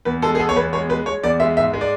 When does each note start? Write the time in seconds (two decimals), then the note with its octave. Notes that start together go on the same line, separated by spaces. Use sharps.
0.05 E2 B4
0.22 G#3 A4
0.35 G#4
0.39 B3 A4
0.49 C#5
0.56 E2 B4
0.73 G#3 C#5
0.89 G#3 B4
1.06 G#3 C#5
1.23 E2 D5
1.40 G#3 E5
1.57 G#2 E5
1.73 G#3
1.81 D5